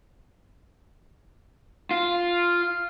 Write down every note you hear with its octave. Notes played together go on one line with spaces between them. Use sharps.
F4